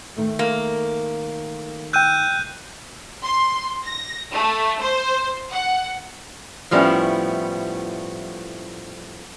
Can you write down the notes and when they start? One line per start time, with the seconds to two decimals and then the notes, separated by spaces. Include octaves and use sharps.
0.16 D#3 A3
0.39 A#3
1.93 G5 E6 F#6 G6 D#7
3.24 C6
3.84 A#6
4.32 A3
4.81 C5
5.51 F#5
6.71 A2 F3 G3 B3 C#4 E4